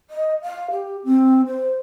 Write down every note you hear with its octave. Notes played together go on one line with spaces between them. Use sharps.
D#5
F5
G4
C4
C5